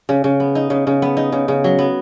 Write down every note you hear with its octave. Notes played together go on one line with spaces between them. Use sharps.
C#3
C#3
B3
D#4
C#3
C#3
B3
D#4
C#3
C#3
F#3
B3